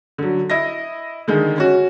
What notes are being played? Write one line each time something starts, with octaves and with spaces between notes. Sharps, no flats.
D3 F#3
E4 D#5 A#6
D3 D#3 G#3
C#4 F#4